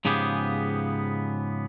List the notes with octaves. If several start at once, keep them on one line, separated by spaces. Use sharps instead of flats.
G#2 C#3 F3 B3 G4 G#4